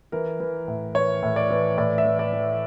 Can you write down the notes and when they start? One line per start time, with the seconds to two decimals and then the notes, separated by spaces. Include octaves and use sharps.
0.12 E3 A#4
0.40 E3
0.68 A2
0.95 E3 C#5
1.23 A2
1.36 D5
1.50 E3
1.78 A2 D5
1.98 E5
2.05 E3
2.19 D5
2.33 E3